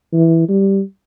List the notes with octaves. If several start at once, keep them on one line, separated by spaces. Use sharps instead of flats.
E3
G3